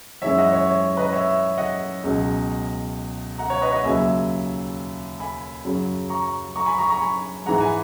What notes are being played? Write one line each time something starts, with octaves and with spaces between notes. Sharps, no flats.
F#2 E3 G#3 C#5 E5
D#5 F#5
C#5 E5
C#5
B4 D#5
C#5 E5
D#5 F#5
C#2 B2 F#3
F#5 A#5
C#5
B4 D#5
D#5 F#5
D#2 C#3 F#3 E5 G#5
G#5 B5
F#2 C#3 F#3
A#5 C#6
A#5 C#6
G#5 B5
A#5 C#6
A#5 C#6
G#5 B5
G#2 E3 G#3 F#5 A#5
G#5 B5